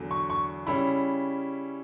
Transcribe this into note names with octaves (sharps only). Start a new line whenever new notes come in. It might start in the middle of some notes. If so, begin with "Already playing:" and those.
Already playing: E2 D3 F#3
C#6
C#6
C#3 G3 C#4 E4 B5